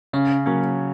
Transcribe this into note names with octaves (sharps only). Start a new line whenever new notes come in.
C#3 C#4
F#3 A#3 C#4